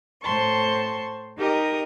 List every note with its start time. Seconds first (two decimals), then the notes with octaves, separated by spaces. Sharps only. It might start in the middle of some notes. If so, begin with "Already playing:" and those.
0.23 A2 C5 A5 C6 C#6
1.38 D#4 G4 A#4 D#5